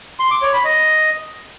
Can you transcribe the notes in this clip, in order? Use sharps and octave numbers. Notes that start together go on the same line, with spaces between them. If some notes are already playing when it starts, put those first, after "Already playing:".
C6
D6
C#5
B5
D#5